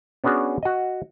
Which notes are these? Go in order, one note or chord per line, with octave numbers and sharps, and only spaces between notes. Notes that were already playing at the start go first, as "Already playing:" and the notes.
B3 C#4 D4 F#4 G#4
F#4 D#5